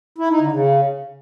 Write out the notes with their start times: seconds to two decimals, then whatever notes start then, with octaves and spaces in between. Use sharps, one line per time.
0.18 E4
0.30 D#4
0.41 D3
0.52 C#3